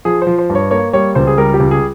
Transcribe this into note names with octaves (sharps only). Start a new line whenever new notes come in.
F3 G#4
C5
F3
C5
G2
C#5
A#3 C#5
G3 C#5
C#2 C5
G#4
G3 A#4
G4
C#2
G#4